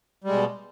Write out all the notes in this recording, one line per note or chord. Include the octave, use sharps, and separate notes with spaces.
B2 G3 G#3